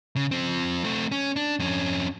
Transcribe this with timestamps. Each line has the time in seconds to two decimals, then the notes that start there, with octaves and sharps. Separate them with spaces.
0.16 C#3
0.31 F3 C4
0.84 A3 C4
1.11 C#4
1.36 D4
1.59 F2 C#4